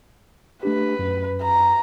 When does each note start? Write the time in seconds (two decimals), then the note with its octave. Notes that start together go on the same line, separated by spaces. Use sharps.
0.63 A3 D4 G4 B4
0.99 F#2
1.42 A#5